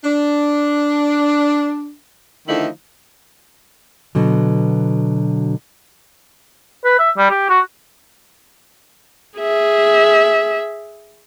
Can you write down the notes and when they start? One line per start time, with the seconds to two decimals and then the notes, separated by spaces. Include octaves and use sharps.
0.04 D4
2.48 D3 D#3 F3 A3 D#4 E4
4.15 B2 D3 F#3
6.85 B4
6.99 E5
7.17 G3
7.30 G4
7.49 F#4
9.39 G#4 E5